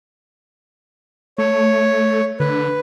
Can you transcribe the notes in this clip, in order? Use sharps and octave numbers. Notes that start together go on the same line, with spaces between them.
A3 C#5
D3 B4